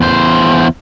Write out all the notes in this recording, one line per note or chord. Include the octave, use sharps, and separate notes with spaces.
E2 C5